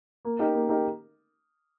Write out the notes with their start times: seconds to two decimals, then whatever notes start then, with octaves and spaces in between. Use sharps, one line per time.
0.25 A#3
0.39 D#4 G4 A#4
0.55 A#3
0.69 D#4 G4 A#4